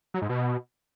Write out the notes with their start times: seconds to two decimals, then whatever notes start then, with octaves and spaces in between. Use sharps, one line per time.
0.14 F#3
0.22 G#2
0.29 B2